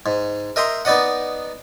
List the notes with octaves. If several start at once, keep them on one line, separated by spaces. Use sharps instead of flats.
G#2
A#4 D#5 E5 G5 A#5 C6
B3 D#4 D5 D#5 F#5